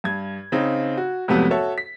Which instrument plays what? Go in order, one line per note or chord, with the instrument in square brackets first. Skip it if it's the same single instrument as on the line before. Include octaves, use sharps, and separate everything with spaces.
[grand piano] G2 G#6
C#3 C4 D#4
F#4
F2 G#2 C3 F#3 A3 B3
F#4 A4 C#5 E5
B6